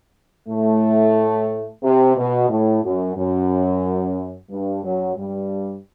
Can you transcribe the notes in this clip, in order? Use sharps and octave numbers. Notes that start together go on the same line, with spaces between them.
A2 A3
C3
B2
A2
F#2
F#2
G2
F#2 F#3
G2 G3